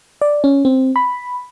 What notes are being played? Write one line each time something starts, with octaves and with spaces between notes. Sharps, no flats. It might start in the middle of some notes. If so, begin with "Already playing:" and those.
D5
C#4
C4
B5